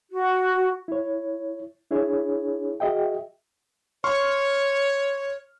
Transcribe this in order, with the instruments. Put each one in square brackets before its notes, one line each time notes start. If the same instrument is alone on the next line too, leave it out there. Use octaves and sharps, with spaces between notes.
[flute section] F#4
[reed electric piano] E4 C#5
D4 E4 G#4 C#5
F#4 G#4 D#5 E5 G5
[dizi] C#5 [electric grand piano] C6 C#6 F6